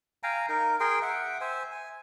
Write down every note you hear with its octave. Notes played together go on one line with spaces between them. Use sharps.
F5 G5 G#5 A#5
D#4 A#4
G#4 A#4 G5 C6
E5 F#5 G5
C5 E5 G#5
G#5